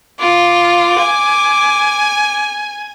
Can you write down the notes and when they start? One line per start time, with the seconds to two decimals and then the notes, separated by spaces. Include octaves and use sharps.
0.19 F4 D6
0.99 G#5